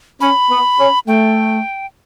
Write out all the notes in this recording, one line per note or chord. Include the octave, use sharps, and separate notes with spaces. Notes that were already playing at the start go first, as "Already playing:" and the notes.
C#4 B5
B3
C#4
A3 G5